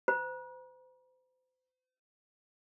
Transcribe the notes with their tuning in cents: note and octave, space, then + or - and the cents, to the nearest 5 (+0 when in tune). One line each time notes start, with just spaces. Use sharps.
C5 -40 A#5 +45